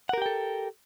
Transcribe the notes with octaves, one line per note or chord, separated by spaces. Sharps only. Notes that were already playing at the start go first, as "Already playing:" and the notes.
G4 A4 A#4 F#5 G5